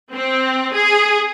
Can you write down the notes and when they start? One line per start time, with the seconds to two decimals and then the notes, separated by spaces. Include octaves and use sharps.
0.12 C4
0.73 G#4